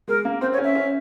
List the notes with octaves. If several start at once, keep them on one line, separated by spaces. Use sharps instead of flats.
G#3 A#4
A#3
C4 C5
C#5
C#4
E5
C#4